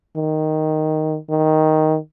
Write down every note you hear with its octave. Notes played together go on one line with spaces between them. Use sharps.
D#3
D#3